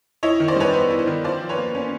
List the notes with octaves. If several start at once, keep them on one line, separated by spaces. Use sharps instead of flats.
E4 C#5 D#5
D#3
C5 D5
G3 B4 C#5
B3 C5
E4
C5
D#3
F4 C5 D5
F3
B4 C#5
A#3
C#4